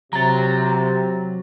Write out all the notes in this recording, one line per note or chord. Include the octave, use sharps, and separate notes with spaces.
C3 F#3 A#5 A6